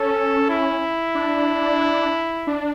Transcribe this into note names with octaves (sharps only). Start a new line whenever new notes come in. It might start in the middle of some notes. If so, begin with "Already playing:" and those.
Already playing: C#4 A4
E4
D4
D4